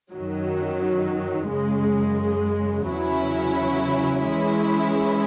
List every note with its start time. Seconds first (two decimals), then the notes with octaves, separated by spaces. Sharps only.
0.11 F#2 D#3 F#3
1.49 F#2 C#3 G#3
2.87 E2 C#3 F#3 C#4 E4
4.24 E3 G#3 C#4 E4